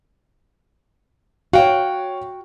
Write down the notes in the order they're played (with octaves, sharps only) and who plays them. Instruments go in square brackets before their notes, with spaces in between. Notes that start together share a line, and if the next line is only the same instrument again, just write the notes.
[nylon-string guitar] F#4 G5 [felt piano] C#5 F5